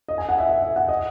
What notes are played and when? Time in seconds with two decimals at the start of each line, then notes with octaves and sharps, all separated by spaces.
0.08 D#5
0.18 G#5
0.29 F#5
0.38 E5
0.49 E5
0.62 E5
0.76 F#5
0.88 D#5